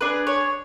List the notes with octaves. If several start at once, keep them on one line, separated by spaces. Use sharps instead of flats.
D4 G#4 B4
C#5